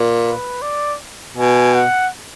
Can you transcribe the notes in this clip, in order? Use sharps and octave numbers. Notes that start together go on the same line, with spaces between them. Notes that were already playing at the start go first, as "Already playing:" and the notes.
Already playing: A#2
B4
D5
B2 G#5
F#5